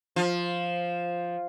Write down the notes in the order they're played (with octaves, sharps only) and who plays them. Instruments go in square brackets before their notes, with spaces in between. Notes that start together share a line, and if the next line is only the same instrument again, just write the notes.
[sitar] F3